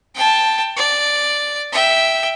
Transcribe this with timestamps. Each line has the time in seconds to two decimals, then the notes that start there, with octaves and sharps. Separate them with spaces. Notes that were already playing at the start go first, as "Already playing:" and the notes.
0.15 G5 A5
0.77 D5
1.72 E5 G5